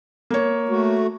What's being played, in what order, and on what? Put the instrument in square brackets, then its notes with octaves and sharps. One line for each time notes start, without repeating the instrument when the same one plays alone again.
[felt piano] A#3 C#5
[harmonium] A3 F#4